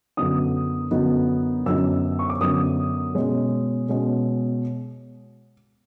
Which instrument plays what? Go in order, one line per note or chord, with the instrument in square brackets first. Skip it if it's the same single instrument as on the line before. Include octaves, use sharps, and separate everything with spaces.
[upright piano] F#2 D3 F#3 B3 D#4 D#6
F#2 D3 F#3 B3 D#4
F#2 D3 F#3 B3 D#4 E6
C#6
D6
F#2 D3 F#3 B3 D#4 D#6
B2 G#3 C#4
B2 G#3 C#4